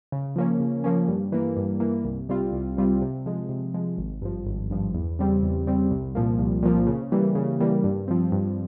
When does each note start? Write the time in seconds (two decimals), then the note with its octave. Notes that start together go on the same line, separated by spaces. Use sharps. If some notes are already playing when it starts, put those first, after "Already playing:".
0.12 C#3
0.36 F3 A#3 C#4
0.60 C#3
0.84 F3 A#3 C#4
1.08 G2
1.32 E3 A#3
1.57 G2
1.80 E3 A#3
2.04 C2
2.29 C3 G3 C4 F4
2.53 C2
2.77 C3 G3 C4 F4
3.02 C3
3.26 F3 G#3
3.49 C3
3.74 F3 G#3
3.98 G#1
4.22 G2 F3
4.46 G#1
4.70 G2 F3
4.94 E2
5.19 C#3 G3 C4
5.43 E2
5.67 C#3 G3 C4
5.91 C2
6.15 A#2 F3 A#3
6.39 C2
6.63 A#2 F3 A#3
6.87 C#3
7.12 E3 G3 A#3
7.35 C#3
7.60 E3 G3 A#3
7.84 G2
8.08 F3 C4
8.32 G2